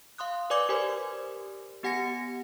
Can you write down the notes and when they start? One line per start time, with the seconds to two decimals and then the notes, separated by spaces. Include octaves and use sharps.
0.18 F5 C6 D#6 F#6
0.50 B4 D5 G#5 D6 G#6
0.69 G4 A#4 C5 G#5
1.83 B3 G4 F#5 G#5 A#6 C#7